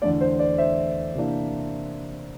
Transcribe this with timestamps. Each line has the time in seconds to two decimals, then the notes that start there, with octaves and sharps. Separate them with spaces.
0.02 E2 D3 A3 D5
0.21 C5
0.39 D5
0.58 C5 E5
1.14 C3 E3 A#3 D4